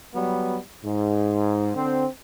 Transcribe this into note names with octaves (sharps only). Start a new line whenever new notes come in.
F#3 G3 B3
G#2
D3 C4